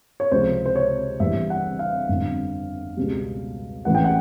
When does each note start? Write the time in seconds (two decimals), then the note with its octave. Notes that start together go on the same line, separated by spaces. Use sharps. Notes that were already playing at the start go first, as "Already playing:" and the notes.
0.20 C#5
0.31 C#2 C3 F3 C5
0.66 C5
0.76 C#5
1.20 G1 G2 E3 E5
1.50 F#5
1.79 F5
2.09 G1 F2 D3
2.97 C#2 B2 G3
3.85 A1 A2 E3 G#3 F#5
3.95 G5
4.04 F#5